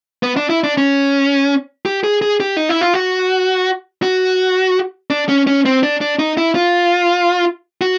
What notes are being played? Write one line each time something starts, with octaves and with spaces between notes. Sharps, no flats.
B3
D4
E4
D4
C#4
G4
G#4
G#4
G4
D#4
E4
F4
F#4
F#4
D4
C#4
C#4
C4
D4
D4
D#4
E4
F4
F#4